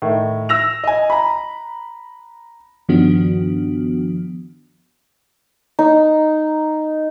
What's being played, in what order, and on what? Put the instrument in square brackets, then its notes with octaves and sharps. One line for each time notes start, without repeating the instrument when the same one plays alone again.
[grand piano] A2 D#3
E6 A#6 F7
D#5 G#5
A#5 B5
[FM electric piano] G2 D#3 F3 B3 D4 F#4
[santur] D#4